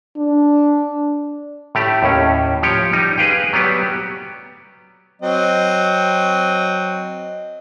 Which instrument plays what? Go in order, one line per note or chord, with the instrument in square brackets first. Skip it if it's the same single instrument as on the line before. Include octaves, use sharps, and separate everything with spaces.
[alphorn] D4
[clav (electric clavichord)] A2 A3 G4
D#2 A2 C#4
F3 G4 C#5 G5
G3 D#4
G#4 B4 F5 G5
F#3 G3 B3 G4
[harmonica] F#3 C4 D#5